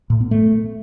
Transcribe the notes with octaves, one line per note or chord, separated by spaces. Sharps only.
A2
B3
A3